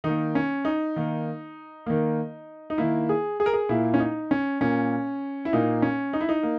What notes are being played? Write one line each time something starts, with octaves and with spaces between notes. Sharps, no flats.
D#3 D#4
A#3
C#4
D#4
D#3 A#3
D#3 A#3
D#4
D#3 A#3 E4
G#4
G#4
A#4
G#4
A#2 A#3 E4
C#4
D#4
C#4
A#2 A#3 C#4
E4
A#2 A#3 D#4
C#4
D#4
E4
D#4
A#3